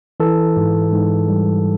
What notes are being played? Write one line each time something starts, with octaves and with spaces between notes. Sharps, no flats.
E3 A4
G#2
G#2
G3